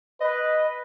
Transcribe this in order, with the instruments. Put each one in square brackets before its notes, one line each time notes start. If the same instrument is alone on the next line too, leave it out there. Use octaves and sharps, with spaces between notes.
[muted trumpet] B4 [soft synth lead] D#5